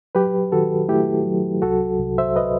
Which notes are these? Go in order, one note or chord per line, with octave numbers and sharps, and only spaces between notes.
F#3 G4 B4
D#3 F#4 A4
A3 E4 G4
F#3
C2 F#4 A4
C2
C5 E5
B4 D#5